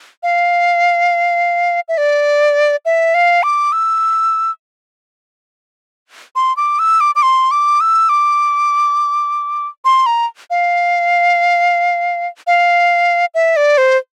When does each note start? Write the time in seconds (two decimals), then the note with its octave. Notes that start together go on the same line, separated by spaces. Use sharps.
0.23 F5
1.89 E5
1.98 D5
2.85 E5
3.14 F5
3.43 D6
3.72 E6
6.36 C6
6.57 D6
6.79 E6
7.00 D6
7.15 D6
7.23 C6
7.51 D6
7.81 E6
8.09 D6
9.85 C6
10.06 A#5
10.50 F5
12.47 F5
13.34 E5
13.56 D5
13.78 C5